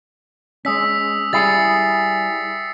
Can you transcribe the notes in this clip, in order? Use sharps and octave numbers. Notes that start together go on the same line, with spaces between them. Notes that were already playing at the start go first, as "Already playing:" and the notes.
G#3 C#4 D#6 E6 B6
G3 E4 G#4 A6 C7 C#7